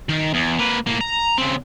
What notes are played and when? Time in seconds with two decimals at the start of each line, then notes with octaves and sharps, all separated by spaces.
0.09 D#3
0.34 E2
0.59 A#3 B4
0.87 A2 A#3
1.01 A#5
1.38 C#3 C4